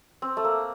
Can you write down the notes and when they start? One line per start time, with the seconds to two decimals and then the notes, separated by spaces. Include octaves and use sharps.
0.22 C4
0.37 A3
0.44 A#3